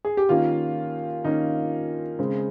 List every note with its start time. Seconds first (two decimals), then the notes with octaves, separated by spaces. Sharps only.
0.05 G#4
0.17 G4
0.29 D#3 A#3 C#4 F4
1.24 D#3 A#3 C#4 D#4
2.19 C#3 G#3 C4